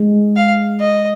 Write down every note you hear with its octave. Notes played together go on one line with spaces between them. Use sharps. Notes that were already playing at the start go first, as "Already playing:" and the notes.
Already playing: G#3
F5
D#5